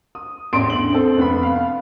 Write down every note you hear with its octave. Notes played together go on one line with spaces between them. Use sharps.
D#6
A1 E2 C6 D7
D3 F#7
C4 A4
F1 B3 B5
F5